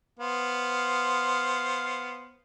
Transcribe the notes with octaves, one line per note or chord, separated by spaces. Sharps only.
B3 C5 F5